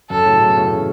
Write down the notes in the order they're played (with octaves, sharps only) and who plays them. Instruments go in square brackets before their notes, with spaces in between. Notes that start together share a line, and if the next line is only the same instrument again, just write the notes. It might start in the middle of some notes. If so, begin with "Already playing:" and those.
[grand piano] F#2 [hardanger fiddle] A4
[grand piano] A2 C#3
F#2 B2
A2 C#3
B2 E3